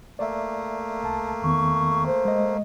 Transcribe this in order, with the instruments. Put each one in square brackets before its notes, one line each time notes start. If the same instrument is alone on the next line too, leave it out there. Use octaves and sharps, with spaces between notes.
[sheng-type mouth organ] A3 A#3 [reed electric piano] D5 E5
[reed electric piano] C2 A5
[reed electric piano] E2 D#3 B3 [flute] C#6
[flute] C5
[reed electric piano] G#3 D#5